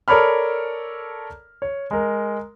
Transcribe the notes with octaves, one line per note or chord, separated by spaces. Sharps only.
A4 A#4 C#5 D5 B5 F6
C#5
G#3 A#4